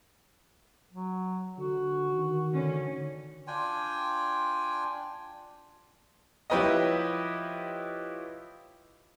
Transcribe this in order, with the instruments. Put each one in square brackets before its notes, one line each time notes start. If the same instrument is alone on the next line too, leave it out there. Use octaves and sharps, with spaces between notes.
[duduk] F#3
[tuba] D3 [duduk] F#4
[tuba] D#3
[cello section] D3 C#4
[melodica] D4 F4 G5 G#5
[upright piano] F3 E4 G4 B4 C#5 D#5